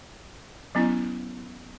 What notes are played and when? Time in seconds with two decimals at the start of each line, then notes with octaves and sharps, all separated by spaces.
0.75 F#3 B3 C#4 E4